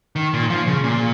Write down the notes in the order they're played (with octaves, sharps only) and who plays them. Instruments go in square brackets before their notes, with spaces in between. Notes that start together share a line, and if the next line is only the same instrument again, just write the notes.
[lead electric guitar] D#3
A#2
F3
C#3
A#2